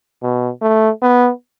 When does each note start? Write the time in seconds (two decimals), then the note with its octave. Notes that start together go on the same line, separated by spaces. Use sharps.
0.22 B2
0.62 A3
1.02 B3